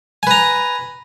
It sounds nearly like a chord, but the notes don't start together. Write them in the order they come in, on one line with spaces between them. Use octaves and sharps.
G#5 B4 A#5